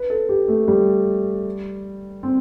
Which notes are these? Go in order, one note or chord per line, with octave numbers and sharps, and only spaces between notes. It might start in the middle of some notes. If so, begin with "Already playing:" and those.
Already playing: B4
A4
G4
A3
G3
C4